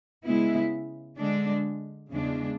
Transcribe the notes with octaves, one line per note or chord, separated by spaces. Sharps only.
C#3 G#3 B3 E4
D3 G#3 D4
E2 C#3 G#3 D4